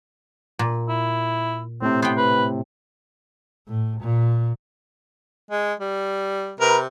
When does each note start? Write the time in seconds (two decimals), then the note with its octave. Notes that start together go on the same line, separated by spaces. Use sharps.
0.59 A#2
0.89 E4
1.82 A2 C3 C4
2.02 B3 C5 G5
2.17 B4
3.68 A2
4.01 A#2
5.51 G#3
5.80 G3
6.60 C3 A#4 B4